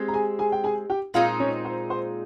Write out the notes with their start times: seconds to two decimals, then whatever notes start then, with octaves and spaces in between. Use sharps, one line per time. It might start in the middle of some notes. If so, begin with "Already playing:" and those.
Already playing: G#3 C4 G4
0.08 A#5
0.14 G#4 G#5
0.39 G#4 G#5
0.52 G5
0.64 G#4 G#5
0.90 G4 G5
1.14 A#2 G#3 C4 D#4 F4 F5
1.40 C#4 C#5
1.65 C5
1.90 C5